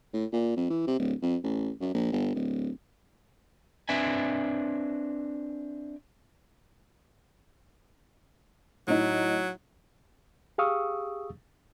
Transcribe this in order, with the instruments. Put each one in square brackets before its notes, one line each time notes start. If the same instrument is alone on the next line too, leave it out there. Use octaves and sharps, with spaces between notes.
[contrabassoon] A2
A#2
F2
E3
C3
D1
F2
A1
F#2
A#1
G1
D1
[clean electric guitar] C4 D4 B4 E5 G#5
[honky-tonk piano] A2 D#4 [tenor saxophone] F#3
[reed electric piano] G4 G#4 F5 C#6 D#6 E6